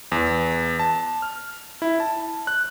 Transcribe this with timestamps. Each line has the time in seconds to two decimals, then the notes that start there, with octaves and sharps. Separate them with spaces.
0.12 E2
0.79 A5
1.22 F6
1.82 E4
2.00 A5
2.47 F#6